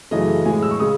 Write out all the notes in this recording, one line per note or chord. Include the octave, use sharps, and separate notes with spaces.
F#2 C#3 E3 A3 D#5
A2 G#3 G#5
E6
C#6
C#3 G#3 D#6